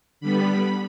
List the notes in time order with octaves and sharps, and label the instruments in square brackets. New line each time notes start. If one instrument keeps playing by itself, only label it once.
[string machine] D3 G3 B3 B5